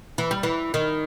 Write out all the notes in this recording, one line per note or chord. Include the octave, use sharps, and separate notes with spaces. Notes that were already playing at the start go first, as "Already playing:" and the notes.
E3
G3
E3
D#3